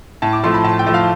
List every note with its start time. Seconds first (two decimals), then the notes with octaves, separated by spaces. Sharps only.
0.22 A2 A5
0.33 D6
0.44 F3 A3 C6
0.54 B5
0.64 A2 A5
0.79 G5
0.87 F3 A3
0.94 F5